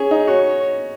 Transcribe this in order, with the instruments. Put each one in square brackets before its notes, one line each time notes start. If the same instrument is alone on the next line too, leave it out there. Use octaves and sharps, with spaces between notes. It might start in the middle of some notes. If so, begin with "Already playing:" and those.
Already playing: [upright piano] C#4 [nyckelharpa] G#4
[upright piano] D#4
[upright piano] F#4 [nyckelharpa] C#5